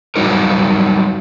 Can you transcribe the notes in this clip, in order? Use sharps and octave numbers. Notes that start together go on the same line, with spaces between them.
F#3 G3 D#4 A#4